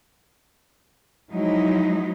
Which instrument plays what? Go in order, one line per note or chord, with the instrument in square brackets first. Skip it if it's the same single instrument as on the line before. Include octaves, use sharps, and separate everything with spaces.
[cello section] F3 F#3 G#3 D#4 E4